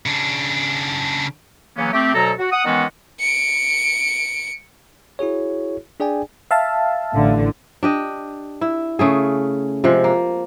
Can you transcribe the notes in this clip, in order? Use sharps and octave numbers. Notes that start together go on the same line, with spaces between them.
C#3 D4
C#3 E3 F#3 A#3 B3 C#4
A3 C4 G4
D2 B2 F#3 A4 A#5
F#4
F#5 D#6
D#3 E3 G#3 B3 C#4 F#4
C#7 D7
E4 F#4 G#4 C#5
D4 G#4 D5 G5 G#5
E5 F5 A5
A1 D3
D4 G4 D#5
E4
C#3 A3 G#4
C3 F3 G#3
A#3